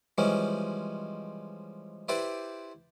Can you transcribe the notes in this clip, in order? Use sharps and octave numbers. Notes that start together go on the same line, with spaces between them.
E3 F3 G3 G#3 C4 C#4
E4 G4 B4 C5 D5 E5